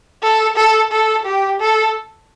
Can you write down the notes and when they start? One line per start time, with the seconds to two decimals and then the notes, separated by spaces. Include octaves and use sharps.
0.23 A4
0.56 A4
0.92 A4
1.25 G4
1.60 A4